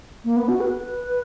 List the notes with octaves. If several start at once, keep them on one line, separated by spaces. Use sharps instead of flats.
A#3
B3
F#4
B4